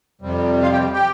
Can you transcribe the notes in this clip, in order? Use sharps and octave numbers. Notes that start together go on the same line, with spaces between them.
F2 C3 G3
F4 F5
G4 G5
G4 G5